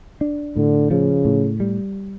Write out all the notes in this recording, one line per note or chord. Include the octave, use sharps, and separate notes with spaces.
D4
A2 D3
C#3 F3
A2
G3